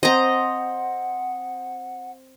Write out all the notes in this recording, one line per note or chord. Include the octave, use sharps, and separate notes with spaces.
C4 C5 D#5 F#5 A#5